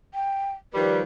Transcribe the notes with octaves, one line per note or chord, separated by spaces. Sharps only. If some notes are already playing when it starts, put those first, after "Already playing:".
G5
D#3 F3 G3 B4